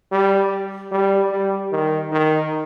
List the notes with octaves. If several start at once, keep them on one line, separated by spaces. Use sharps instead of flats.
G3
G3
G3
D#3
D#3